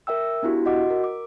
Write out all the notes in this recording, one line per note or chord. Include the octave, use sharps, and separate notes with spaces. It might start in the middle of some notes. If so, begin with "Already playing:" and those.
A#4 E5 G5 E6
B3 D4 E4 F#4 G4
F#4 D#5 F#5 D6
A#4
D6